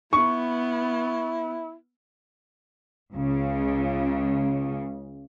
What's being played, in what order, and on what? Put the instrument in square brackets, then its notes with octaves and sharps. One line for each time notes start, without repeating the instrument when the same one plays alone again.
[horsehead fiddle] B3 [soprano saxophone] E4 [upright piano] C#6
[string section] C#2 C#3